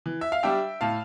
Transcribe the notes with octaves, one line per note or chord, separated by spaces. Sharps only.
E3
E5
F5
G3 D4 E5 G5
A2 F5 A5